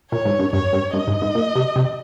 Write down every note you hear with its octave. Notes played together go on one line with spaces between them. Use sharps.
A#2 C#5
G#2
G2
G2 C#5
G2
G2 D#5
G#2
G#2
A#2
C3
C3